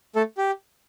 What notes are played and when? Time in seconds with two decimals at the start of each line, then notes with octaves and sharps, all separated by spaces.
0.16 A3 A4
0.38 G4